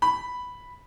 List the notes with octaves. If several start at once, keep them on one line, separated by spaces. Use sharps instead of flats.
B5